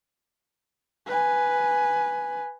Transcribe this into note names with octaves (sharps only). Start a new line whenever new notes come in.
B4 G#5